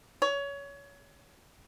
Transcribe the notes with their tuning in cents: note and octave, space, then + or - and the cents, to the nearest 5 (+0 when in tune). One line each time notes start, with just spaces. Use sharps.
C#5 +25